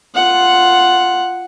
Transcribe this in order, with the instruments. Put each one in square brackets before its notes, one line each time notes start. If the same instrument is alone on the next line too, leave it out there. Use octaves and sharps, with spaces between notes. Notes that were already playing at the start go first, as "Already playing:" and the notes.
[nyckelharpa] F4 F#5